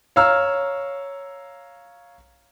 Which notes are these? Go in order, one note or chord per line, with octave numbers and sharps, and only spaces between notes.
C#5 F5 A#5 E6 F6